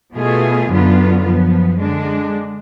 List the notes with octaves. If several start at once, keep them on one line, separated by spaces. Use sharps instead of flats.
B2 A3 F4 G#4
F#2 D3 F#3 B3 F4
F#2 F3 B3
D3 G#3 D4